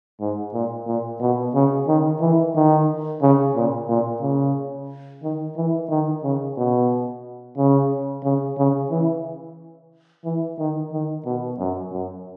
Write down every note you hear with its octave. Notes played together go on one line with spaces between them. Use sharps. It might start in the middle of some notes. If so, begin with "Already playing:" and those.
G#2
A#2
A#2
B2
C#3
D#3
E3
D#3
C#3
A#2
A#2
C#3
D#3
E3
D#3
C#3
B2
C#3
C#3
C#3
E3
E3
D#3
D#3
B2
F#2
F#2